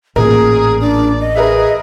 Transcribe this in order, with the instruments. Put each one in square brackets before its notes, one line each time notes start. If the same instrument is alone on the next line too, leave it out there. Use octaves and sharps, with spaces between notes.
[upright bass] A1 [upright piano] A#2 A#4 [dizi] G#4
[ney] D4 [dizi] D5
[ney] D#5
[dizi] G#4 [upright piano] A#4 B4 E5